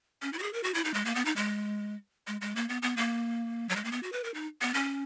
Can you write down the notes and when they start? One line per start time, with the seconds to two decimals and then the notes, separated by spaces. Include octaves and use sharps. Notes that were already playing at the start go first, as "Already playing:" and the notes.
0.22 C#4
0.33 E4
0.39 F#4
0.43 G#4
0.53 A#4
0.63 F#4
0.74 E4
0.84 D#4
0.94 G#3
1.05 A#3
1.15 B3
1.25 D#4
1.36 G#3
2.27 G#3
2.41 G#3
2.56 A#3
2.69 B3
2.82 B3
2.97 A#3
3.69 F#3
3.76 G#3
3.84 A#3
3.92 B3
4.03 F#4
4.12 B4
4.24 A#4
4.34 D#4
4.61 B3
4.74 C#4